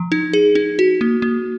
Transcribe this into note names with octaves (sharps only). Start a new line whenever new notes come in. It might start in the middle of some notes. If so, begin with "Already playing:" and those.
Already playing: F3
D#4
G#4
D#4
F#4
A#3
A#3